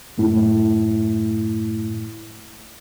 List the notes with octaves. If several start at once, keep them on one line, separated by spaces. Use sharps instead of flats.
F#2 A2 A3 E4